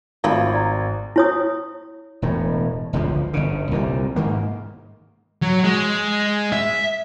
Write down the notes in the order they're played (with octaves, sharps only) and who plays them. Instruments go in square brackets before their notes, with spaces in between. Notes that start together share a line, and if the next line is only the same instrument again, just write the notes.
[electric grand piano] G#1 [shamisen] A3 F4 B5 [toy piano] D#4 D5
[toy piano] D5 A#5
E4 C#5 D#6
[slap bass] E1 A2
G1 C#2 D3 F3
G1 C#3
C2 A#2 E3 G3
G#2 D#3 A#3
[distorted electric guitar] F#3
G#3
E5